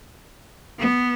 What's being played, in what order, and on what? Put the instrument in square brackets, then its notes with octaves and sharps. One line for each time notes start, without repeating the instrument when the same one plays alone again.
[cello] B3